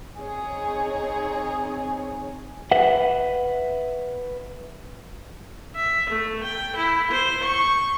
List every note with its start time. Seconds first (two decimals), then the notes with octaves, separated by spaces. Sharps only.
0.17 C4 D#4 G#4 C#5
2.71 B4 E5 F#5
5.75 E5
6.10 A3
6.44 G5
6.77 E4
7.11 C5
7.44 C#6